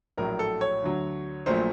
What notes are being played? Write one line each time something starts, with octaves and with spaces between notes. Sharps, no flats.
A#1 A2 F#3 A#4
A4
C#5
D2 D3 F#3
A#1 A#2 F#3 A3 C5